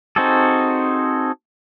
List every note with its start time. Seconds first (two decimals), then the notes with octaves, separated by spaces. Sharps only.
0.16 C4 D#4 F#4 G#4 A4